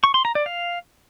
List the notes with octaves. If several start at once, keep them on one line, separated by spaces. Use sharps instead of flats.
C#6
C6
A#5
D5
F5